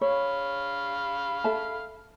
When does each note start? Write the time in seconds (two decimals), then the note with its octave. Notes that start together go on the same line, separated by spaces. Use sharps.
0.01 C#5 F5 B5
1.44 A4 E5 A5